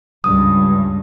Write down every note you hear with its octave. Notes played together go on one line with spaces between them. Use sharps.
C#2 G2 D#6